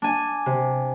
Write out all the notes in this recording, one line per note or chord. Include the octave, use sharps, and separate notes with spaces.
D4 G#5
C3